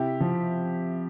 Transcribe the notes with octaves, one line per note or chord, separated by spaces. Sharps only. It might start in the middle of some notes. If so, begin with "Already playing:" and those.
Already playing: C3 E4 G4
F3